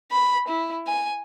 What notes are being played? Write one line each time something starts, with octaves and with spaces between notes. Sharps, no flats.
B5
E4
G#5